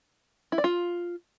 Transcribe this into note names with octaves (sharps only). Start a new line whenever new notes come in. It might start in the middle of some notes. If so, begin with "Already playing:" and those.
E4
D5
F4